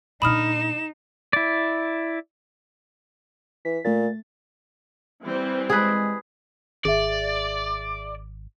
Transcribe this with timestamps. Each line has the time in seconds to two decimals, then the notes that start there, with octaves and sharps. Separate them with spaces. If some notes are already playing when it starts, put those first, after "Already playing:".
0.22 A#2 D3 D#4 B5 D#6 F6 E7
1.33 E4 D5
3.65 E3 B6
3.85 A#2 A3 A6
5.23 E3 G3 C4
5.70 G#3 G#4 B4
6.85 G#1 G#4 D5 E5